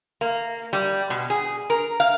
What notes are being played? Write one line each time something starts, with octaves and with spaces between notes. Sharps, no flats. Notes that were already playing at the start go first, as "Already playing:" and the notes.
A#3
G3
B2
G#4
A#4
F5